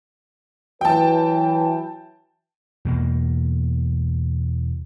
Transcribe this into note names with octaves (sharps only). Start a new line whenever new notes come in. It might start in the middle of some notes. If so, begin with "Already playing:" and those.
E3 F#3 B4 G5 A5
E2 B2 A#3